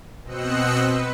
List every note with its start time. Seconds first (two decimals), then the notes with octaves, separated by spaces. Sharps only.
0.23 B2 C4 D#5 E6 F#6 C#7
0.78 B4